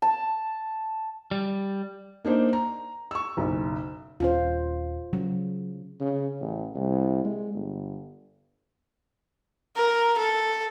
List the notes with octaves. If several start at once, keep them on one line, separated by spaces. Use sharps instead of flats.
A5
G3
A#3 D4 D#4 C5
A#5
C#6 E6
F#1 B1
D#1 C#4 F4 C5
C#3 F#3
C#3
A1
C2
G#3
G1
A#4
A4